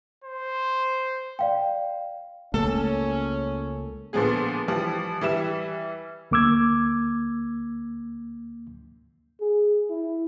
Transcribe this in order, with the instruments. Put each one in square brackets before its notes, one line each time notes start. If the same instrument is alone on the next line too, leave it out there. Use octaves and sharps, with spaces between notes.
[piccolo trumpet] C5
[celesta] D5 F5 G5
[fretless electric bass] C#2 A3 A#3 [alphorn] C#4 [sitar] A4
[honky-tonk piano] A#2 D3 F3 G#3 B3 G#4
E3 F3 G3
E3 G3 E5 E7
[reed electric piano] D2 A#3 D6 E6 G#6
[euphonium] G#4
E4